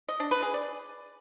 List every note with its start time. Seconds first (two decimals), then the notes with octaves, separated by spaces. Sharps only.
0.08 D#5
0.20 D4
0.31 B4
0.43 G#4
0.54 D5